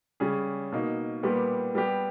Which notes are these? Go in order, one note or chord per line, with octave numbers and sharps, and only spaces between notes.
C#3 G3 C#4 G#4
B2 A#3 D#4
A#2 G3 B3 G4
G3 B3 G4